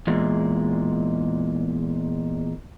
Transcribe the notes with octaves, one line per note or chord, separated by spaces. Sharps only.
E2 A#2 G#3